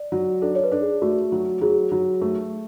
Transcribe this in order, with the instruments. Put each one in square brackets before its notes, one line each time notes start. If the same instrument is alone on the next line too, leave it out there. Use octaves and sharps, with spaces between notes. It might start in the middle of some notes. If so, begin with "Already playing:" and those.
Already playing: [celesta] D5
[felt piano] F#3
[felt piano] D4 [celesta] A4
[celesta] C#5
B4
[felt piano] D4 [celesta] A4
[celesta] G#4
[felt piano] A3 [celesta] F#4
[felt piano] F#3
[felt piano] F#3 [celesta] G#4
[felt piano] F#3
A3